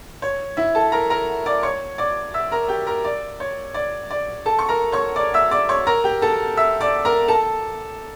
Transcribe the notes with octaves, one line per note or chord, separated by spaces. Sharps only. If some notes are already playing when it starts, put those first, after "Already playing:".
C#5
E4 E5
A4 A5
A#4 A#5
A#4 A#5
D5 D6
C#5 C#6
D5 D6
E5 E6
A#4 A#5
G4 G5
A#4 A#5
D5
C#5
D5
D5
A4 A5
C#6
A#4 A#5
C#5 C#6
D5 D6
E5 E6
D5 D6
C#5 C#6
A#4 A#5
G4 G5
A4 A5
E5 E6
D5 D6
A#4 A#5
A4 A5